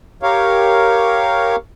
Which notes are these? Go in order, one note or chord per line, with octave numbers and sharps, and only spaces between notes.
G4 A#4 C#5 F5